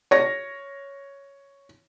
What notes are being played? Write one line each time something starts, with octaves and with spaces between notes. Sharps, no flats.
C#5 A#6